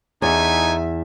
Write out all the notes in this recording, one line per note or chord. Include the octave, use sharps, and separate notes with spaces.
E2 A3 B3 D#4 E5 G#5